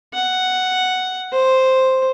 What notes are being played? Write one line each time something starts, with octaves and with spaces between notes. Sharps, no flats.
F#5
C5